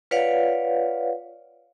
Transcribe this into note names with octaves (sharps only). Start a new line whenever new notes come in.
F4 B4 C#5 D5 F5 F#5